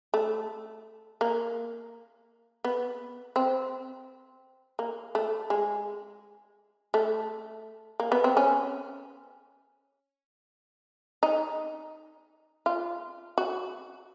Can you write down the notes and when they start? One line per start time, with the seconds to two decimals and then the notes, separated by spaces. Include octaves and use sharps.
0.14 A3
1.21 A#3
2.64 B3
3.36 C4
4.79 A#3
5.15 A3
5.50 G#3
6.94 A3
8.00 A#3
8.12 B3
8.24 C4
8.37 C#4
11.23 D#4
12.66 F4
13.38 F#4